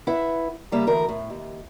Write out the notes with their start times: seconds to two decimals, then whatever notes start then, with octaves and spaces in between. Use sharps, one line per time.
0.07 E4 B4 E5 F#5
0.72 C#3 G3 A#3 E5
0.87 D2 E3 A#4
1.09 A2
1.30 D#2